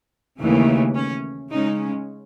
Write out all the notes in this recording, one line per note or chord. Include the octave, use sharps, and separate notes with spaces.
D#2 C#3 E3 A3
C#4
C#3 G#3 C#4 D#4